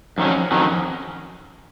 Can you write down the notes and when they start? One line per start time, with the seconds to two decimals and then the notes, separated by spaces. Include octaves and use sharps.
0.18 F2 D#3 F#3 C#4
0.52 F2 D#3 F#3 C#4